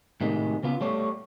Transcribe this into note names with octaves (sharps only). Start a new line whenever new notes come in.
A2 C3 D#3 G#3
C#3 B3 F4
G3 A3 C#5